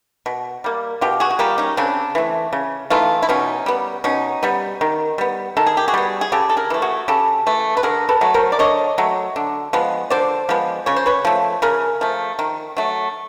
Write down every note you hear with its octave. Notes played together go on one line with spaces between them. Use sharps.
B2
G3 A#3
B2 F4 G4
F#4 G#4
F#4
G3 A#3 F4 G4
C#4 D#4
C#3 C4 D4
E3 A3
C#3
E3 A3 D#4 F4
E4
B2 C#4 D#4
G3 B3
B2 C#4 D#4
G3 B3
D#3
G3 B3
D#3 A4
G#4
G4
F#4 G#4
G3 B3
G#4
C#3 G4 A4
A4
G#4 A#4
E3 A3
F#4 G#4
C#3 G4 A4
E3 A3
B4
D3 G#4 A#4
A4 B4
F#3 A3
A#4 C5
D5
D3 C#5 D#5
F#3 A3
D3
F3 G#3 B3
D3 C5 D5
F3 G#3 B3
C#3 C#5
C5
B4 C#5
F3 A3
C#3 G#4 A#4
F3 A3
D#3
F#3 A3